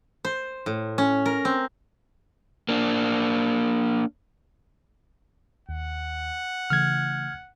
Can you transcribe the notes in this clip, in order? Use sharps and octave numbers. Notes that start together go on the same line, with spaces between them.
C5
A2
C#4
A#4
C4
A#3 D4
D#2 F#5
C#3 E3 A3 F6 G#6